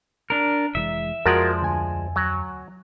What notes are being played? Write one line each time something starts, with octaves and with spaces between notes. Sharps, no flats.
D4 A#4
F1 E3 G#3 E5
F2 F3 G#3 F#4 A#4 D5
D2 G#5
F#3